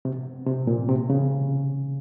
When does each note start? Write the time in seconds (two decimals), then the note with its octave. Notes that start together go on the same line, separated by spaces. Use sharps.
0.05 C3
0.46 C3
0.67 A#2
0.89 C3
1.10 C#3